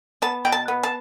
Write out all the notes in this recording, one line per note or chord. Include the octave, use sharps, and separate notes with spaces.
B3 A5
B2 G5
A5
B3
A5